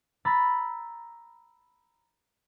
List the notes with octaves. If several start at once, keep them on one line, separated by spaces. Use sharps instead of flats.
A#5 B5 E6 A6